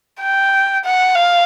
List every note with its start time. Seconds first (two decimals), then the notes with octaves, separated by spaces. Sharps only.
0.20 G5
0.84 F#5
1.15 F5